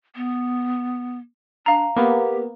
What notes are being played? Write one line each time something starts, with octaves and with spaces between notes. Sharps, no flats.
B3
D4 F5 A#5
A#3 B3 G4